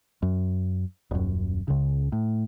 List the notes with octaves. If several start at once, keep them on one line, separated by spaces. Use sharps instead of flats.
F#2
D#1 F#2
C#2 C#3
A2